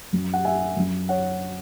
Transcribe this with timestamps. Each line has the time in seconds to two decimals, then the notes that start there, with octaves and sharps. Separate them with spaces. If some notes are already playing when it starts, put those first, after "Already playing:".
0.13 F#2 F#3
0.34 F#5
0.45 E5 G#5
0.76 F#2 F#3
1.09 C#5 F#5